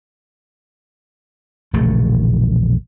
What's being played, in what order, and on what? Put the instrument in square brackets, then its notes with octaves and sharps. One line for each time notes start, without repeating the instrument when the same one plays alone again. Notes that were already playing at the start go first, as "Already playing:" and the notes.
[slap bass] E1 A#1 C#3 A3